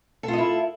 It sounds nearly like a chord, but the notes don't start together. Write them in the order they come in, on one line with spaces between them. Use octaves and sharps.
A4 F4 D#5 E4